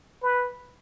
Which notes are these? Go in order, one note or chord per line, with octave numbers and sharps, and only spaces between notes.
B4